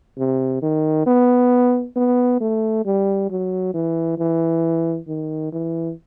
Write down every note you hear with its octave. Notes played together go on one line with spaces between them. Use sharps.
C3
D#3
B3
B3
A3
G3
F#3
E3
E3
D#3
E3